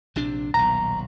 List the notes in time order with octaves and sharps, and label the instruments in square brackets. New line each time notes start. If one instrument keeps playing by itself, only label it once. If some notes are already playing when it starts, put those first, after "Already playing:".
[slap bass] A#1 C3 D4
[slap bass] D#1 B1 [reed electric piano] A#5